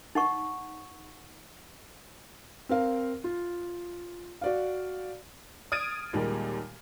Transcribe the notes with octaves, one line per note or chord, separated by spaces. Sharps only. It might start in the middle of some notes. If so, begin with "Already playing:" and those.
D#4 F#5 C#6
C4 A#4 F5
F4
F#4 D5 F5
D#6 F6 G#6 A6 D7 D#7
D#2 A#2 D#3 G3 G#3